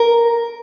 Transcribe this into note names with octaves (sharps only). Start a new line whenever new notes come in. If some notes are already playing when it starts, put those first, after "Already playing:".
Already playing: A#4